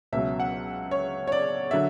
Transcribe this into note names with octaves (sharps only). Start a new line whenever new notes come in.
C#2 B2 F#3 E5
F#5
C#5
C#5
D5
D3 F#3 E5